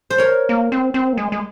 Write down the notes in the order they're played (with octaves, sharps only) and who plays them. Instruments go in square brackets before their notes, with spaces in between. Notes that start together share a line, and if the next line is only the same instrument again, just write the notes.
[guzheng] C5
A#4 C#5
[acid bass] A#3
C4
C4
A#3
G#3
G#3